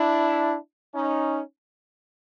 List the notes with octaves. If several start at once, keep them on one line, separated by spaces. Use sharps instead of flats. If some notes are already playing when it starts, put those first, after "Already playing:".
Already playing: D4 E4
C#4 D#4